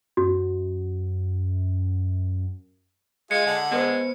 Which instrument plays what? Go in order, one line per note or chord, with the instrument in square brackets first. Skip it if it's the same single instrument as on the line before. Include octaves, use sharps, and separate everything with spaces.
[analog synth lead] F#2 [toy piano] F#4
[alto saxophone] G#3 [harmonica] F4 G#4 [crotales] C#7
[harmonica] D3 F#5
[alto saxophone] G#3 [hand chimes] B3 B4 C5